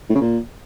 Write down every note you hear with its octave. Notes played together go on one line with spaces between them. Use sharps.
A2
C#3
A#2